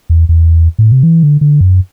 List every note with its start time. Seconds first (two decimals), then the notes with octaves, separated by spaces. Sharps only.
0.10 E2
0.29 E2
0.79 A2
0.92 C3
1.03 E3
1.23 D3
1.41 D3
1.61 F#2